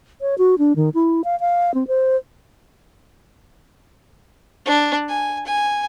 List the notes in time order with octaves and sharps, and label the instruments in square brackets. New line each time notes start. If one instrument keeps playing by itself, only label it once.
[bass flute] C#5
F#4
D4
D#3
E4
F5
F5
C4
C5
[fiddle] D4
G#5
G#5